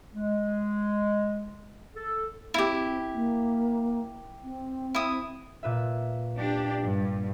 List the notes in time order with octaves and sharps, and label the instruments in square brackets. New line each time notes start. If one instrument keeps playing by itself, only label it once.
[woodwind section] G#3
A4
[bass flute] C4 [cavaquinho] E4 G4
[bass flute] A#3
C4
[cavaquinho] E4 D#6
[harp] A#2 B4 E5
[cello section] D4 G4
G2